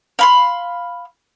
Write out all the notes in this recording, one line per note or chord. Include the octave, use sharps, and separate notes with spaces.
F5 B5 C6